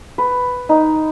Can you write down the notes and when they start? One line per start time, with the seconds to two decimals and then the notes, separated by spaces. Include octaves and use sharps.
0.18 B4
0.69 D#4